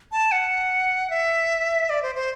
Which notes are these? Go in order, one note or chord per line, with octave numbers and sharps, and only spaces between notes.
A5
F#5
E5
D5
C5
C5